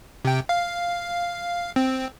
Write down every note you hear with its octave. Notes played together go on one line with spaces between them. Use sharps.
C3 G5
F5
C4